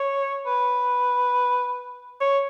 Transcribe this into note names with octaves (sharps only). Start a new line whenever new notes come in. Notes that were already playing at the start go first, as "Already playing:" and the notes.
Already playing: C#5
B4
C#5